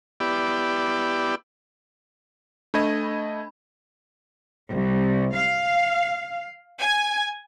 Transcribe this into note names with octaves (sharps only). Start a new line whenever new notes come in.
B3 E4 G4 D5
A3 D4 D#5 B5 G#6
C2
F5
G#5